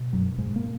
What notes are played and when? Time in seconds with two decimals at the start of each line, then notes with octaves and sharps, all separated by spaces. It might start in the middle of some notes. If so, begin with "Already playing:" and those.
Already playing: B2
0.13 F#2 F#3
0.38 G#2 G#3
0.56 A#3